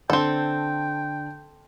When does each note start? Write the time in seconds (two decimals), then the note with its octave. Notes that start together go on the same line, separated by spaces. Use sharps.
0.10 D3 C4 D4 A4 G5